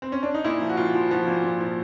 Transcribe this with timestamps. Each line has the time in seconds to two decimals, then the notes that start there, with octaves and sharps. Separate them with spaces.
0.02 C4
0.12 C#4
0.23 D4
0.34 D#4
0.45 A#2 E4
0.61 F3
0.69 F#4
0.77 A#2 F4
0.95 F3
1.11 F3 F#4
1.27 A#2
1.44 A#2
1.60 F3